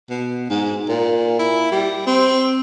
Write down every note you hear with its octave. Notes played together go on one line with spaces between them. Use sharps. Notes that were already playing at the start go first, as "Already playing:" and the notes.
B2
G#2
A#2
E4
G3
C4